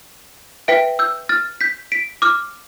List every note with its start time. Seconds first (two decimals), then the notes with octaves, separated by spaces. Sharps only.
0.68 B4 E5 G5 B6 D7
0.99 E6 G6
1.29 F6 A6
1.61 G6 B6
1.92 B6 D7
2.22 D6 F6